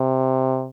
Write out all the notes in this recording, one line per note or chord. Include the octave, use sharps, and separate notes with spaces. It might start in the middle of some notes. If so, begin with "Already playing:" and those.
Already playing: C3